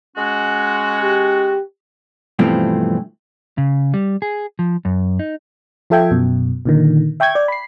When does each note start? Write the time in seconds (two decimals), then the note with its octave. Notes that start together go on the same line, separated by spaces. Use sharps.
0.17 G#3 C#4 F#4
1.02 G4
2.39 G2 B2 E3 F3 A3 C4
3.58 C#3
3.94 G3
4.22 G#4
4.59 F3
4.85 F#2
5.19 D#4
5.90 F3 F4 A4 E5 G5 G#6
6.11 F#2 B2
6.65 A#2 D3 D#3
7.20 E5 G5 C#6 G6 G#6
7.35 D5
7.48 B5 C7